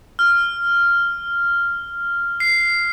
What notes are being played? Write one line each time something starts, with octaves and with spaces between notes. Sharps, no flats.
F6
C7